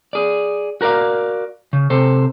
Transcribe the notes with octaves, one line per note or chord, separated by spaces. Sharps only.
G#4 D5
F#4 A#4 B4 D5 F5
C#3
C3 A4 C5